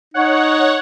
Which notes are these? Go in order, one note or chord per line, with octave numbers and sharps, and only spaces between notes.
D#4 C#5 F#5